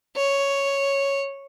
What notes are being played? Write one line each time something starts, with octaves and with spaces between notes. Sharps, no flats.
C#5